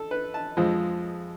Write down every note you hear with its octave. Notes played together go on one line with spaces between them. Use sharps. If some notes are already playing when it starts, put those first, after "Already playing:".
Already playing: A4
B4
A5
F2 F3 G#3